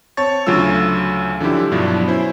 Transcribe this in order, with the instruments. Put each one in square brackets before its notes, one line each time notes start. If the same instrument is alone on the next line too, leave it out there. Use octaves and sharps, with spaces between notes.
[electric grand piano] C4 C#5 A5 C#6 A6
D2 C#3 F#3 A3 F4 E6
D3 F3 F#3 C#4 E4 G4
G2 B2 F3 F#3 D4 E4
C#4 E4 C5